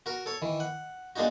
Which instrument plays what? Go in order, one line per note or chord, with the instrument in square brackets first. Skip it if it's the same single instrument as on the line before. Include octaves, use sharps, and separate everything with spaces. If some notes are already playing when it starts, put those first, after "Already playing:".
[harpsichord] F#4 A#4
A4 C#5
D#3 E3
F#5
G#3 A#3 D4 D#4 F#4